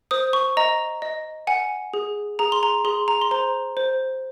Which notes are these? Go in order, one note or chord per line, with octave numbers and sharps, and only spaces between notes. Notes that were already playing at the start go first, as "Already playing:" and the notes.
C5 D#6
C#6
D#5 A#5
D#5
F#5 G#5
G#4
G#4 A#5
C6
A#5
G#4 C6
A#5
C6
C5 A#5
C5